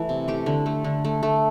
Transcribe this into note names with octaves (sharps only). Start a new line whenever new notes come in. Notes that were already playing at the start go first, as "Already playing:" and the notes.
Already playing: E3 A3
C3
A3 G4
D3
A3
D3
A3
A3